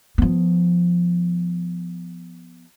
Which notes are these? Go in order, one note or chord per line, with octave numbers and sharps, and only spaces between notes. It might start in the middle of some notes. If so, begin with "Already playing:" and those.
F3 B3